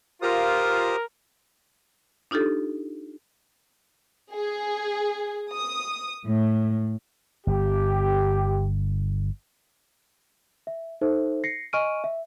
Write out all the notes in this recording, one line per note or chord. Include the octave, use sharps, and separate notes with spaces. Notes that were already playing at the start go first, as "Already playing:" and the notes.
F4 G4 A#4 C5 D#6
D4 D#4 F4 G4 A4
G#4
D#6
A2
G1 G4
E5
D#4 A4 C5 E5
A#6 C7 C#7
D#5 G#5 C#6 F6 D7 D#7
E5